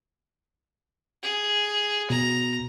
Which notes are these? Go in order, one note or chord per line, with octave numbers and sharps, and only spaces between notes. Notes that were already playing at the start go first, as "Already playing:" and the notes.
G#4
B2 A#5